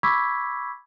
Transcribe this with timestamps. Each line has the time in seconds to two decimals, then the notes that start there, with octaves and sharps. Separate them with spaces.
0.03 B5 C#6 D6 E6 G#6 B6